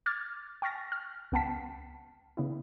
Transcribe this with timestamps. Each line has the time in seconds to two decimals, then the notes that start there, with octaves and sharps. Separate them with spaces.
0.06 D6 F6 G#6 A6
0.62 G5 C#6 F6 A6 A#6
0.92 F6
1.32 C#2 B3 F#5 G5 A5 B6
2.37 C#3 B3 E4